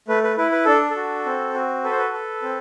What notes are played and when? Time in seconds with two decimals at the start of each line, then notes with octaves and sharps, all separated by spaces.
0.08 A3 B4
0.23 B4
0.37 E4 B4
0.52 B4
0.65 D4 A4
0.90 A4
0.96 F#4
1.26 C4
1.54 F#4
1.84 A4 B4
1.91 C5
1.98 B4
2.13 A4
2.42 C4